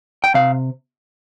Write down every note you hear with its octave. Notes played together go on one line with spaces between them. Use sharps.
G5
C3 F5